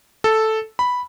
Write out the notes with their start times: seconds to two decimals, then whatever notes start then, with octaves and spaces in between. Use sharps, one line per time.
0.24 A4
0.79 B5